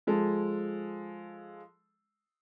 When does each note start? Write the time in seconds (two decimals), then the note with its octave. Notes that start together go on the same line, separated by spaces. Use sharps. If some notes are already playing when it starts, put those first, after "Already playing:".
0.07 F3 G#3 A4